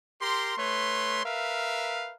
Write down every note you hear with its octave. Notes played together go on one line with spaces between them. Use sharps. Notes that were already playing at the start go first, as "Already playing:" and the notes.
G4 A#4 C6
A3 B4 C#5 C6
A#4 B4 E5 F5